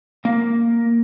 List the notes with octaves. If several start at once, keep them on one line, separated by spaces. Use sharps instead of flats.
A#3 F5